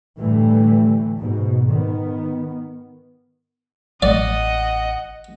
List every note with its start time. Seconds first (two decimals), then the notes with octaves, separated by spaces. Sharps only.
0.19 A2 D3 E3 G3 A3
1.18 G#2 B2
1.69 D#3 B3
4.02 A1 D5 D#5 F#5